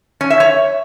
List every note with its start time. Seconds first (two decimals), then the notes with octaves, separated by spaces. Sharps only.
0.21 C#4
0.30 E5
0.40 C#5